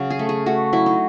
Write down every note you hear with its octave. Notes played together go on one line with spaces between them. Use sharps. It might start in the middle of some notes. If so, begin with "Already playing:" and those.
Already playing: C#3 F#3
G#4
A3
G#4
A3 F#4
F#3 E4
D#4